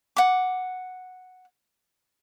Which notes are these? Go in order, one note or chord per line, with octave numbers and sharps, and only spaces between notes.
F#5 D6